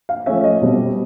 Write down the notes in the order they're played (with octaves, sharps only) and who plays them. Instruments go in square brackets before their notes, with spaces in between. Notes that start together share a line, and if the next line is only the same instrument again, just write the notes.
[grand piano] F5
F3 A3 C#4 E5
D#5
B2 G3 C4